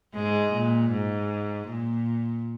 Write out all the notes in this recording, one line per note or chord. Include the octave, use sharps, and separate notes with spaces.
G#2 G#3
A#2
G#2
A#2